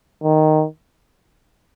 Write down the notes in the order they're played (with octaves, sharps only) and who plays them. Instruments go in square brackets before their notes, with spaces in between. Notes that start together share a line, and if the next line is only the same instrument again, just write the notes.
[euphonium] D#3